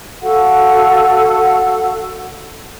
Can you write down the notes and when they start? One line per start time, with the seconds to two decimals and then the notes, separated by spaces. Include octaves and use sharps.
0.22 F#4 A4 F5 F#5